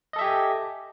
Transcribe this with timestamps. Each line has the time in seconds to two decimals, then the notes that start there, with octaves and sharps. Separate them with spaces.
0.13 D#5
0.16 A4
0.19 E5
0.21 G4
0.24 G#5